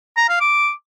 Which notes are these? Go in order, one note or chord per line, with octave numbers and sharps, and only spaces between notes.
A#5
F5
D6